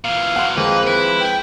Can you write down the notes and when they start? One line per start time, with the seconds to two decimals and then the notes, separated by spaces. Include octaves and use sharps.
0.04 A#2 E3 F5
0.36 B2 F#3 F#5 C6
0.57 F2 F3 G#3 A#3 B4
0.87 E4 B4
1.21 G5